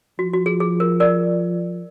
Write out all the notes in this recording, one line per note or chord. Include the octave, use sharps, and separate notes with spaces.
F3 F#4
F#4
G#4
G#4
A#4
A#4 D5